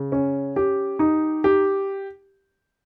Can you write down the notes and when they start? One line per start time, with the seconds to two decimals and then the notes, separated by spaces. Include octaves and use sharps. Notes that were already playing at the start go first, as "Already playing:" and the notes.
Already playing: C#3
0.12 C#4
0.56 G4
0.99 D#4
1.44 G4